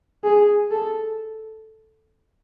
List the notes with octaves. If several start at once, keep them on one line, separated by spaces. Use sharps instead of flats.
G#4
A4